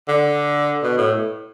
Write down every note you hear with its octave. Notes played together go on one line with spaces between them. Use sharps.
D3
B2
A2